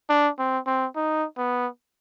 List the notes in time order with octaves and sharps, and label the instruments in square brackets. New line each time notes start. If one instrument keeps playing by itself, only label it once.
[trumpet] D4
C4
C4
D#4
B3